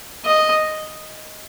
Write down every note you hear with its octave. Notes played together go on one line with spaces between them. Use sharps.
D#5